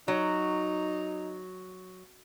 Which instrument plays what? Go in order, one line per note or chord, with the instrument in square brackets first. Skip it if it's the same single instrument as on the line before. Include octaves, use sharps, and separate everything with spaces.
[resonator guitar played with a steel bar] F#3 [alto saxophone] D#4